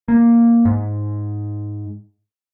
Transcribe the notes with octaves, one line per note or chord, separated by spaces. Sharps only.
A#3
G#2